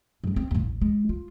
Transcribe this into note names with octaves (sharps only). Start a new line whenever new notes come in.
F#2 G3
C4
D#2 A#2
A1
G#3
F4